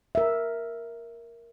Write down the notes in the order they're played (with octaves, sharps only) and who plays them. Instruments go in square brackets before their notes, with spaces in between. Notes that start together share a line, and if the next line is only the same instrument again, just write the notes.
[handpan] A#4 E5